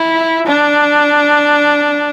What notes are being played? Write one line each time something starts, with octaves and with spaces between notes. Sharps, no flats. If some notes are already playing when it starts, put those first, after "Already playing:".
Already playing: E4
D4